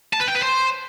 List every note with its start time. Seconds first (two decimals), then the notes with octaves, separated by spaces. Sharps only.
0.13 A5
0.20 B4
0.27 G5
0.35 B4
0.42 C5